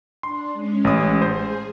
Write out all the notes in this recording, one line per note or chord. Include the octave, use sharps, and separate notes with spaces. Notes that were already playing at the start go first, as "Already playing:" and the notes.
D4 C6
G#3 C#4
A1 D#6
G#4 C5